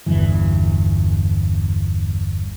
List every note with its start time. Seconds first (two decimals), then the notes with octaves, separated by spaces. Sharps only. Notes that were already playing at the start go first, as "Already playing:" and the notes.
0.06 G1 E2 G2 E3